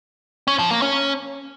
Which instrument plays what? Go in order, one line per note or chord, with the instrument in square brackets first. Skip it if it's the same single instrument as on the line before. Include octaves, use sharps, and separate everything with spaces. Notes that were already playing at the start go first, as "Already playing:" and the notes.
[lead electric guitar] C#4
F3
A#3
C#4